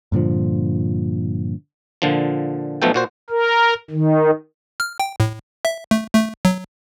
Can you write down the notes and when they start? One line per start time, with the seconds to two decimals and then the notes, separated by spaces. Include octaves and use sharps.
0.12 G2 A#2 D3 F3
2.02 A#2 D3 F3
2.82 B1 B2 F3 A3 A4 G5
2.94 A#2 F#4 C5
3.30 A#4
3.90 D#3
4.80 F6
5.00 G5
5.20 A2
5.65 E5
5.91 A3
6.15 A3
6.45 F#3